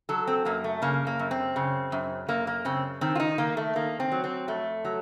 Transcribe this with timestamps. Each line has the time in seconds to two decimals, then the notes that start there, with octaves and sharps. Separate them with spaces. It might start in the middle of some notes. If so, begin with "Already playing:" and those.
0.09 F#3 A4
0.27 C4
0.45 F#2 A#3
0.64 A3
0.82 C#3 A#3
1.07 A#3
1.19 F#2
1.31 C4
1.56 C#3
1.92 F#2
2.28 F#2 A#3
2.47 A#3
2.65 C#3 C4
3.01 D#3 C4
3.15 F4
3.20 D#4
3.38 D#3 A#3
3.57 A3
3.75 D#3 A#3
4.00 C4
4.12 F#3
4.24 C4
4.48 F2 A3
4.85 F#3